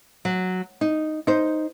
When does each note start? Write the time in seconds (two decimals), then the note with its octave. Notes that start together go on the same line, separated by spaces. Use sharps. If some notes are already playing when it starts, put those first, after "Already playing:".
0.25 F#3
0.81 D#4
1.27 D#4 C5